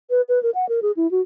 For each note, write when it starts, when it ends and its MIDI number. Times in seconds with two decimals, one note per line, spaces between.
0.10 0.21 71
0.28 0.41 71
0.43 0.50 70
0.55 0.68 78
0.69 0.80 70
0.82 0.91 68
0.96 1.09 64
1.11 1.21 66